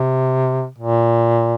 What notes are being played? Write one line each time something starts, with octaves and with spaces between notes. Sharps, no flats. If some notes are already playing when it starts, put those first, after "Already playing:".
Already playing: C3
A#2